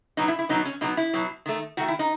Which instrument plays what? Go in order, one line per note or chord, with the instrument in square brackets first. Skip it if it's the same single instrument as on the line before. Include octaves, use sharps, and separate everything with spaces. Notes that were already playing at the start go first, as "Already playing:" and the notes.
[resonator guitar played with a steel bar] B2 F#3 B3 D#4
E4
E4
B2 F#3 B3 D#4
C#4
B2 F#3 B3 D#4
E4
B2 F#3 B3
D#3 A3
D#3 A3 F#4
E4
D#4